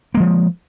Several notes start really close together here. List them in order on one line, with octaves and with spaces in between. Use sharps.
A#3 G#3 F3